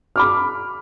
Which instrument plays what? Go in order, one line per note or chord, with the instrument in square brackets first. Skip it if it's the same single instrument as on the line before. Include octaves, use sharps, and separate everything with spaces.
[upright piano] B5 D6 F6